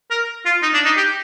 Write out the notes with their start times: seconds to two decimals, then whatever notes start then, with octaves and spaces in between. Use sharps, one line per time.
0.11 A#4
0.46 F4
0.62 D#4
0.74 D4
0.85 D#4
0.97 G4